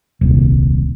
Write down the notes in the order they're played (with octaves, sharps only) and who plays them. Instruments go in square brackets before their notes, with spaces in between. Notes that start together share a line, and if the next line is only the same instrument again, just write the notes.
[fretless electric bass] D#1 C2